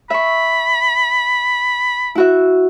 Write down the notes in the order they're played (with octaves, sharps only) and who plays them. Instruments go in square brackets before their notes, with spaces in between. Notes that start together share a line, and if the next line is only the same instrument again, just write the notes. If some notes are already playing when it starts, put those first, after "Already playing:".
[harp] E5 C#6 [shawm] B5
[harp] E4 F#4 E5